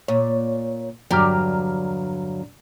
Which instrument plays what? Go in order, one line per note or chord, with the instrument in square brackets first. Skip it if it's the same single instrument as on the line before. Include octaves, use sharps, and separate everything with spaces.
[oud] A#2 [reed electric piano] C#5
[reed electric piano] E2 A#5 F6 [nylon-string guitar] G2 D3 F#3 [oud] G4 D5